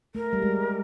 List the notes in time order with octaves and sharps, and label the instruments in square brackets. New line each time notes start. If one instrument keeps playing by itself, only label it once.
[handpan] A3 [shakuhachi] A#4
[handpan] G3
G#3